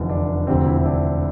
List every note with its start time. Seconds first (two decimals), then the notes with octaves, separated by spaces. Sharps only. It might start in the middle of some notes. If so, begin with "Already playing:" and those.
Already playing: F1 E2 D3 F3
0.09 D4
0.47 E1 D2 C3 F3 C4
0.67 E4
0.86 D4